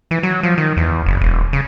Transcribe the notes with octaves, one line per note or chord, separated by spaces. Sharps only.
E3
F#3
F3
D#3
E2
F#1
E1
C#3